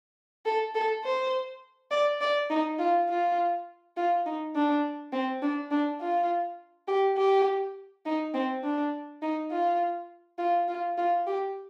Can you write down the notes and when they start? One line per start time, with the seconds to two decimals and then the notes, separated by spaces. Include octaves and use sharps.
0.46 A4
0.75 A4
1.04 C5
1.91 D5
2.21 D5
2.50 D#4
2.79 F4
3.09 F4
3.97 F4
4.26 D#4
4.55 D4
5.13 C4
5.42 D4
5.71 D4
6.01 F4
6.88 G4
7.17 G4
8.06 D#4
8.34 C4
8.64 D4
9.22 D#4
9.51 F4
10.38 F4
10.68 F4
10.98 F4
11.27 G4